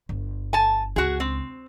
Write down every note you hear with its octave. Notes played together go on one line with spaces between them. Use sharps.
G1
G#5 A5
C#2 F#4 G#4
C4